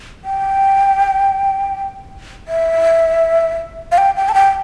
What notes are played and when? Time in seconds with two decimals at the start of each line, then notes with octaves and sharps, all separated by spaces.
0.24 G5
2.48 E5
3.92 F5
3.98 G5
4.16 G5
4.29 A5
4.34 G5